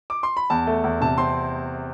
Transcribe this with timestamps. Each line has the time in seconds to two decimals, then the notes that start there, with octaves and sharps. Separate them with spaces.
0.10 D6
0.23 C6
0.37 B5
0.50 E2 A5
0.67 A3
0.84 E2
1.01 C3 A5
1.18 C4 C6